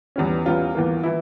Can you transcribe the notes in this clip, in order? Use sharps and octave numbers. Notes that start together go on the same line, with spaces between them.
E2 E3 G3 C#4
E2 E3 G3 C#4 F4
E2 E3 A#3
E3 E4